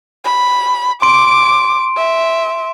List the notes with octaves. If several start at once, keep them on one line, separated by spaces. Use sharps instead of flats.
B5
C6 D6 D7
E5